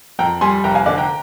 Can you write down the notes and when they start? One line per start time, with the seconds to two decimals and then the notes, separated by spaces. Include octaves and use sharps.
0.19 F2 G5 A#5
0.41 G3 G#5 C6
0.64 F1 G5 A#5
0.75 F5 G#5
0.86 D3 D5 F5
0.98 G5 A#5